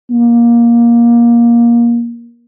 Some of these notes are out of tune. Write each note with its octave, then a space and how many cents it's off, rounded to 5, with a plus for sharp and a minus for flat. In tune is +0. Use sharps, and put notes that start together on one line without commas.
A#3 +15